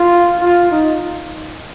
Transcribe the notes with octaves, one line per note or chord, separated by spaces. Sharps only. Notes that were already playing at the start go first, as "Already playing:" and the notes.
Already playing: F4
F4
D#4